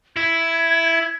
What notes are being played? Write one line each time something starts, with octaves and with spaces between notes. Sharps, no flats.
E4 G#6